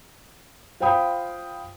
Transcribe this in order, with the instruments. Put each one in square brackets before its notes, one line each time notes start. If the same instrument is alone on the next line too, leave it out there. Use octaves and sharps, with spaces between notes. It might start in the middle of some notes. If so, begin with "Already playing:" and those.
[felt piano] F4 C5 F5 G5 B5 D#6